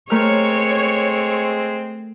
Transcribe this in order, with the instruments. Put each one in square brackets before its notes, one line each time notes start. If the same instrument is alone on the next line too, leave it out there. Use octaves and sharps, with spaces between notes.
[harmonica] G#3 C4 [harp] A3 A#4 F6 [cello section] C#5